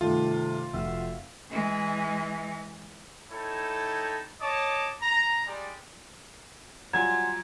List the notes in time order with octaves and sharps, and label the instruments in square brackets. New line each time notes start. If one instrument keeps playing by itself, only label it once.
[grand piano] G2 D#3 A3 [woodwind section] C3 [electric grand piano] F4
[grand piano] F1 E6 [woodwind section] F#4 E5 F5
[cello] E3 G#3
[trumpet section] D#4 E4 A4 C#5 G5
C#5 D#5 A5 D6
A#5
G3 G#3 D5
[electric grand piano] F#3 G3 F4 [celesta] F#5 G#5 C6 [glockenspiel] A#5 [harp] G#6